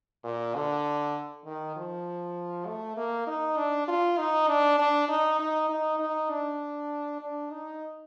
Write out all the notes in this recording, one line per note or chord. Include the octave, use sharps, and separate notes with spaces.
A#2
D3
D#3
F3
A3
A#3
D#4
D4
F4
D#4
D4
D4
D#4
D#4
D#4
D#4
D4
D4
D#4